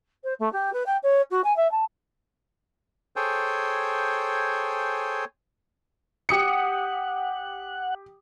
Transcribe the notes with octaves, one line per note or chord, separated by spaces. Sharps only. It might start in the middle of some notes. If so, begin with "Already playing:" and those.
C5
A3
G4
B4
G5
C#5
F#4
G#5
E5
A5
G#4 A4 C5 C#5 G5 G#5
G4 F#5 D#6 C#7